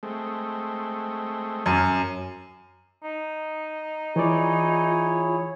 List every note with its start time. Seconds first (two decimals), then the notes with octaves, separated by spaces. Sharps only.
0.03 G#3 A3 C4
1.66 F#2
3.03 D#4
4.16 E3 E4 F4 G#4 C#5 D5